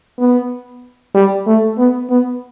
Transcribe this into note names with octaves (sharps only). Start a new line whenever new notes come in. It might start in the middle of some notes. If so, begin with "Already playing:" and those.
B3
G3
A3
B3
B3